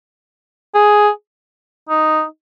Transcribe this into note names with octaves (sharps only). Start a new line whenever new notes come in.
G#4
D#4